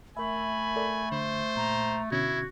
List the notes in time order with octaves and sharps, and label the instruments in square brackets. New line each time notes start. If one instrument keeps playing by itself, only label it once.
[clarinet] A3 [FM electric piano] A#4 E5 [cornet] G#5 [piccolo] B5
[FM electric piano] A4 A#4 D5
[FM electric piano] D3 [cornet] C5
[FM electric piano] A#2 [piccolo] A#5
[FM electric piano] B2 D3 C#4 [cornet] E4 [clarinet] F#4 [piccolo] G#6